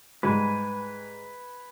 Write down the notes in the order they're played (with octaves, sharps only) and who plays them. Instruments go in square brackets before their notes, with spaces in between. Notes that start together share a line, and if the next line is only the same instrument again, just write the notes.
[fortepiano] G#2 G3 [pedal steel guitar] B4 G#5